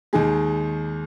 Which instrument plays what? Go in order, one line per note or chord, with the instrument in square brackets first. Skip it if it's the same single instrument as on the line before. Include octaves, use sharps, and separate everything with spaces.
[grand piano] D#2 D#3 G#3 G#4